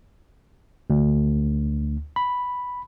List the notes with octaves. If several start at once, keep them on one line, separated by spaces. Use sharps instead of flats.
D2
B5